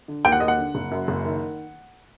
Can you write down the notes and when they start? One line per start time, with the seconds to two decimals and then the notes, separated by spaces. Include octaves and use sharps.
0.08 D3
0.25 D#2 G5
0.32 F#5
0.40 D#2 D#5
0.48 F#5
0.58 D3
0.75 F#1
0.91 F#2
1.08 F#1
1.25 D#3